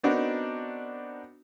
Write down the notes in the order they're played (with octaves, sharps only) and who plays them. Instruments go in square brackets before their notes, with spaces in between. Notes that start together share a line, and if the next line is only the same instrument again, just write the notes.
[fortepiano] B3 C4 D4 D#4 F#4 A#4